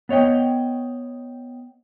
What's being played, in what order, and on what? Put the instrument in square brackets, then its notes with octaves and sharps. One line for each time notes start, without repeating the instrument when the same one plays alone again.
[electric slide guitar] B3 C#5 D#5 G5